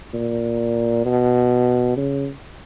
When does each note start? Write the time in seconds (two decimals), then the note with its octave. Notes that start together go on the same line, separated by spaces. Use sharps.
0.14 A#2
1.05 B2
1.97 C#3